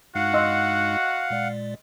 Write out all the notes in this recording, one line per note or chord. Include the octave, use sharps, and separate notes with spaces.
G2 G#3 D#4 F#4 F5 F#5
D#5 C6 E6
A#2 G#3 D5